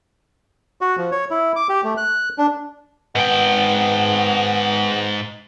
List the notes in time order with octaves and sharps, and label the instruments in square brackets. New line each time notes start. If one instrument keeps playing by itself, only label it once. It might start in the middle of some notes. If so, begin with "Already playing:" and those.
[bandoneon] F#4
F3
C#5
E4
D6
G4
A3
F#6
D4
[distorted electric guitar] G#2 G5 [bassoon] B3